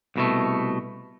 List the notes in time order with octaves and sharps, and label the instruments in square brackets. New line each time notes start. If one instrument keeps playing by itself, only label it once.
[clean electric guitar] C2 B2 A3